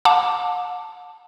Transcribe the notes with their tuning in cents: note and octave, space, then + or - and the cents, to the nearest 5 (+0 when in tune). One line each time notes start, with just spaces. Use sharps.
F#5 -40 A5 +10 D6 +0